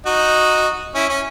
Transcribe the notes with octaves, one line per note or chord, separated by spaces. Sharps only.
D#4 F#4
C#4 E4
C#4